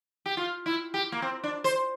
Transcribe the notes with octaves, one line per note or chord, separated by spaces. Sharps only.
G4
F4
E4
G4
A#3
C4
D4
C5